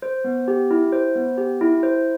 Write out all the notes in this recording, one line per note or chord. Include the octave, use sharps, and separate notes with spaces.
C5
B3
G4
E4
C5
B3
G4
E4
C5